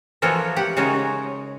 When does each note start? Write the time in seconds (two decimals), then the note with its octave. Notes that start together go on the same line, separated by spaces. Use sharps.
0.22 E3 F3 A#3 F4 F#4 C#5
0.56 G4 F#5
0.77 C#3 G#3 D#4 F#4 A#4 C#5